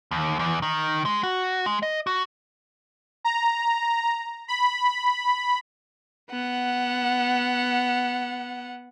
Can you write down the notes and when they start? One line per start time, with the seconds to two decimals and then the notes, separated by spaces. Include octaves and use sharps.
0.11 D#2
0.39 E2
0.62 D#3
1.05 G#3
1.23 F#4
1.66 G#3
1.83 D#5
2.07 F#4
3.24 A#5
4.48 B5
6.30 B3 F#5